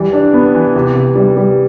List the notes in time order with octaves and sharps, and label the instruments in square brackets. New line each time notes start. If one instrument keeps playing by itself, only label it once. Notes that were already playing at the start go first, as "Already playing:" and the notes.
Already playing: [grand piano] E3 G3
D4
B3
E3
C3
C3
G3
G3